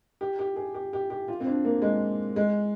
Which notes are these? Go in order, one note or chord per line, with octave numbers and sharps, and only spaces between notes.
G4
G4
G#4
G4
G4
G4
F4
C4
D4
A#3
G#3
G#3